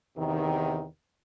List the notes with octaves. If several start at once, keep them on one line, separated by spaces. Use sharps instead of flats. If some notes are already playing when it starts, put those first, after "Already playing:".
E2 C3 D#3